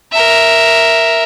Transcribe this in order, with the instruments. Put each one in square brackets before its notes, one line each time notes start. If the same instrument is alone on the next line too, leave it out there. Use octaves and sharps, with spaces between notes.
[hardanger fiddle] A#4 E5